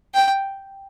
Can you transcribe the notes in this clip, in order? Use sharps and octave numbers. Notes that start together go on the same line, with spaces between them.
G5